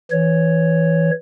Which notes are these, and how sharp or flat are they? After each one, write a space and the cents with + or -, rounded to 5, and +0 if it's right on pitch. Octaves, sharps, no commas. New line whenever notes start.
E3 +0 C#5 +0